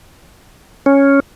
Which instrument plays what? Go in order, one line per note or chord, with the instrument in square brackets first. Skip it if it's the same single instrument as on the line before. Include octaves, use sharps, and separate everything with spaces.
[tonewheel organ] C#4